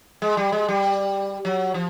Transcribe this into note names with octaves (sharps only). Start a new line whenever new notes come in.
G#3
G3
G#3
G3
F#3
F3